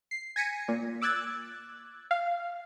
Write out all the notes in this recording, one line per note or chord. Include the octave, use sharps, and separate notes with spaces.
C7
G#5 G#6 A#6 B6 C#7 D#7
A#2
D6 E6 F#6 G#6 A6
F5